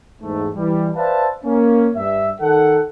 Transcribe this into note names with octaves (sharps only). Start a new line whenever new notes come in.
E2 G#2 A3
E3 G3
B4 C5 D5 E5 F5 A5
A#3 C#4
G2 E5
D#3 A4 F#5